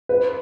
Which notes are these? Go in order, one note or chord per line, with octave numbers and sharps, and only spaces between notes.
B4